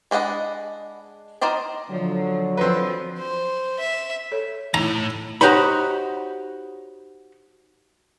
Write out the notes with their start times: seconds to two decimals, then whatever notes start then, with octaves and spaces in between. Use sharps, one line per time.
0.11 G#3 D4 D#5 F#5 B5
1.41 D#4 A#4 C5 D5 D#5
1.91 D3 F3 F#3
2.57 F3 C4 B4
3.19 C5
3.79 E5
4.32 A4 C#5
4.74 A2 D#4 E4 A#5
5.41 D#4 F#4 G4 C5 C#5 B5